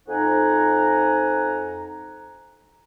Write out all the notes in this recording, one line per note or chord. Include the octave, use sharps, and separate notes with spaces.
F2 D#4 C5 F#5 G#5 A#5